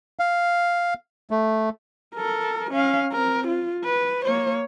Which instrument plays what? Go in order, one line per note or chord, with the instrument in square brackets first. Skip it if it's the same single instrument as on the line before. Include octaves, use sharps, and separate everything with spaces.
[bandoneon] F5
A3
[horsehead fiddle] A4 A#4
C#4 F5
C4 A#4
F4
B4
A#3 C#5